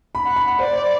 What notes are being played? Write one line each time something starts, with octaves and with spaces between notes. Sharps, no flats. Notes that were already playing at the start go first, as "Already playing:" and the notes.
B5
F#5
B5
C5 D5